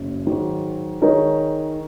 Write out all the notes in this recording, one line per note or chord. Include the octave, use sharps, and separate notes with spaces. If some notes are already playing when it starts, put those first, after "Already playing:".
Already playing: F#1 F#2
G#2 D#3 F#3
D#3 G#3 D#4 A#4 C#5